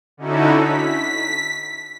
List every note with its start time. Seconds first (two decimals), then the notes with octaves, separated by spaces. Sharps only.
0.17 D3 C#4 D#4 E4 F#4 A4
0.56 B6